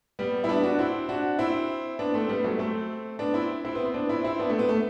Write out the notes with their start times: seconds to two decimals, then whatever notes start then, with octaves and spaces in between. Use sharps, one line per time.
0.19 G3 B3
0.44 E4
0.49 B3 D4
0.64 D4 F#4
0.79 C4 E4
1.09 D4 F#4
1.39 C4 E4
1.99 B3 D4
2.14 A3 C4
2.29 G3 B3
2.44 F#3 A3
2.59 A3 C4
3.19 B3 D4
3.34 C4 E4
3.65 C4 E4
3.75 B3
3.85 C4
3.94 B3 D4
4.09 C4 E4
4.24 C4 E4
4.39 B3 D4
4.49 A3 C4
4.59 B3
4.69 A3